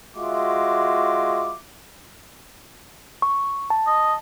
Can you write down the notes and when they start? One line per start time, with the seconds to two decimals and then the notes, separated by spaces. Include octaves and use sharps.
0.15 G#3 F4 F#4 E5 D6
3.22 C#6
3.70 A5
3.87 D#5